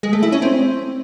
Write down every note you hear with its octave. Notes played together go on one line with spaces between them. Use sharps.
G#3
A3
E4
C#4
C4